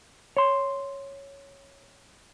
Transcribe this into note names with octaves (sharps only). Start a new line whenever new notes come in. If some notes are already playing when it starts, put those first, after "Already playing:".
C#5 C6